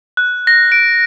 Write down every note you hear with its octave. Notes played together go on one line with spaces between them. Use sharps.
F#6
A#6
D7